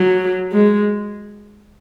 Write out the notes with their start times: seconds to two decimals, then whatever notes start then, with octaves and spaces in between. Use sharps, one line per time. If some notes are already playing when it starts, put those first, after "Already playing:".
Already playing: F#3
0.52 G#3